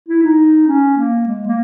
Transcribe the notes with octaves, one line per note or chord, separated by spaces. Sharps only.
E4
D#4
C#4
A#3
G#3
A#3